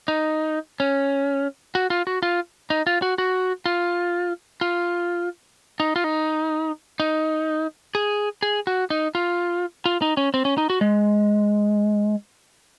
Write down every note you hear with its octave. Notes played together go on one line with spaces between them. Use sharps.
D#4
C#4
F#4
F4
F#4
F4
D#4
F4
F#4
F#4
F4
F4
D#4
F4
D#4
D#4
G#4
G#4
F#4
D#4
F4
F4
D#4
C#4
C4
C#4
D#4
F#4
G#3